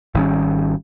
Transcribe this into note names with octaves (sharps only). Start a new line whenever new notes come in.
G#1 D#3 G3 C#4